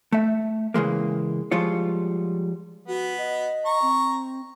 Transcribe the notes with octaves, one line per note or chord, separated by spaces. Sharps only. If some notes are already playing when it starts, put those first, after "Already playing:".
A3 E5
C#3 E3 G#3 A#3
F3 G3 G#3 F4 C#5
B3 F#4
D#5
A#5 C#6
C4